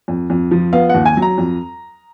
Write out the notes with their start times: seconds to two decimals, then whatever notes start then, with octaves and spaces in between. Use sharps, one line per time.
0.08 F2
0.30 F2
0.51 F3
0.73 B3 F5
0.89 F#5
0.95 D#2
1.05 G#5
1.17 F#3
1.22 A#5
1.38 F2